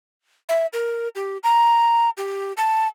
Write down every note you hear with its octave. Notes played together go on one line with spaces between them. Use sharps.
E5
A#4
G4
A#5
G4
A5